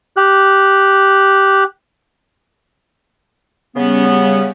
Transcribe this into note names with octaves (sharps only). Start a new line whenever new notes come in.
G4 F#6
C#3 G3 B3 C#4